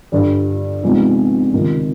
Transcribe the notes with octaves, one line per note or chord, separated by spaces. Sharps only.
G2 D3 G3
C3 F3 G#3 B3 D#4
C#2 C3 D#3